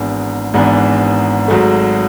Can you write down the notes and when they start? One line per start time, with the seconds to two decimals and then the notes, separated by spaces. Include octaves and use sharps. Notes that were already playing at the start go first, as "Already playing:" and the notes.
Already playing: G#1 G#2 E3 B3 D4
0.54 G#1 G#2 E3 B3 D4
1.48 G#1 G#2 F#3 A3